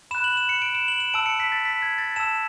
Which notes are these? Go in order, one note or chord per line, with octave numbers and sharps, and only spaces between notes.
B5 F#6 E7
F#7
E7
C#7
D7
E7
F#7
E7
A5 E6 D7
C#7
B6
A6
B6
G#6
A6
A5 E6 E7